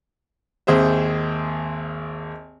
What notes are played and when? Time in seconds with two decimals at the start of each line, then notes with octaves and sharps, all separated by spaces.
0.67 G#1 D#2 G#4 C5 E5